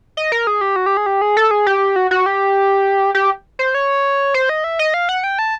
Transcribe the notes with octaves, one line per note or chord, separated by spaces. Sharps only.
D#5
A#4
G#4
G4
F#4
G4
G#4
G4
G#4
A4
G#4
G4
F#4
F#4
G4
G4
C5
C#5
C5
D#5
E5
D#5
F5
F#5
G5
A5